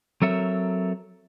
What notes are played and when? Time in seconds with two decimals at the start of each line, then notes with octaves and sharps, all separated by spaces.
0.22 F#3 C4 A4 A#4 C#5 E5